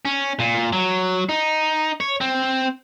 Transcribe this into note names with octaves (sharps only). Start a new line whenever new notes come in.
C#4
A#2
F#3
D#4
C#5
C4